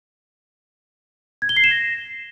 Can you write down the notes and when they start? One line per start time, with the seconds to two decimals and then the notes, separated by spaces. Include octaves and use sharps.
1.42 G#6
1.49 G7
1.57 C7
1.64 E7
1.71 A#6